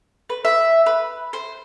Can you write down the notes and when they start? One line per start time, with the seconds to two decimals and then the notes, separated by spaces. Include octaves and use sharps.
0.30 B4
0.45 E5
0.86 B4
1.33 C5